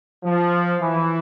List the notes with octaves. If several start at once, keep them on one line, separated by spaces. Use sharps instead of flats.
F3
E3